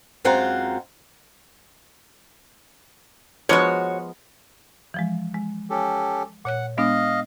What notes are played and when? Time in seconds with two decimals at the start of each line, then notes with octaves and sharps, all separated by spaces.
0.25 F#2 G#3 C4 F4 F#5 A#5
3.49 F3 G#3 B3 F#4 C#5
4.94 E3 F3 G#3
5.34 G#3
5.70 C#4 G4 A4
6.45 A#2 C#5 F#5 F#6
6.78 G#3 B3 D4 D#5 F5